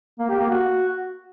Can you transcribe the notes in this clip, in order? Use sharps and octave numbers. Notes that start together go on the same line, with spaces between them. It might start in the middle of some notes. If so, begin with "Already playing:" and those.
A#3
G4
A#3
F#4